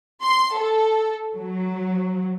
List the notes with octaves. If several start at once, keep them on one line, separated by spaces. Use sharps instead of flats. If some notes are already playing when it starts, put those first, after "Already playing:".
C6
A4
F#3